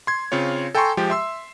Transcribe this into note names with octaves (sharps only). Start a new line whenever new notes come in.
C6 G#6
C#3 C4 F4 C#5
A4 G5 G#5 A#5 C6 C#6
F3 G#3 G4 G5
E5 C6 E6